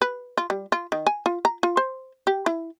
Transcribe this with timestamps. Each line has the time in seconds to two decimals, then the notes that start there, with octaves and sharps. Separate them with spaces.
0.02 B4
0.38 F4
0.50 G3
0.72 F4
0.92 D#3
1.07 G#5
1.26 F4
1.45 A#5
1.63 F4
1.77 C5
2.27 G4
2.46 E4